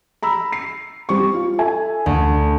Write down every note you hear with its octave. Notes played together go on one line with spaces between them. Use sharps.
A#5 B5 E6
C7
G3 C4 C#6
F4
A4 E5 G#5
D2